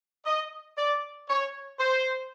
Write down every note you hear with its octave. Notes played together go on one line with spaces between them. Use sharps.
D#5
D5
C#5
C5